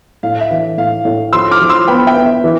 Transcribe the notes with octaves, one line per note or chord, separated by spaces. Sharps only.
A2 F5
E5
E3
A2 F5
A2
F3 C6 E6
D6 F6
F3
C6 E6
B3 G5 B5
E5 G5
B3
E5
E3